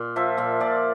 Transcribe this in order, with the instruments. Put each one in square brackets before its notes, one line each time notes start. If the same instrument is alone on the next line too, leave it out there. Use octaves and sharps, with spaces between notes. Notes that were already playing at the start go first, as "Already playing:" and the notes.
Already playing: [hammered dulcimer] A#2
F3 E5
A#2 E5
A#2 D5